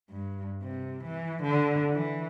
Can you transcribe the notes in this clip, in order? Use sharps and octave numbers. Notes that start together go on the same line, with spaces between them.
G2
C3
E3
D3
E3